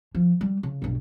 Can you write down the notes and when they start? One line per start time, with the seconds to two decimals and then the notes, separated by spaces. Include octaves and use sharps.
0.15 F3
0.41 G3
0.63 C#3
0.82 B1 G2